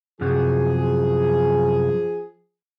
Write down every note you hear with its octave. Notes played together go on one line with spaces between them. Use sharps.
F#2 C3 F3 F#3 G#4